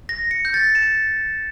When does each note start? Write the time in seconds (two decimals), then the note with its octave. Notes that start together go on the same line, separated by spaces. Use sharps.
0.09 A#6
0.31 C#7
0.45 G6
0.54 A6
0.75 E7